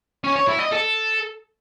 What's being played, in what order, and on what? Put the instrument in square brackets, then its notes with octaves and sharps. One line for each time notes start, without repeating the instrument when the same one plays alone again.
[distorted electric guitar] C#4
C#5
E4
D#5
A4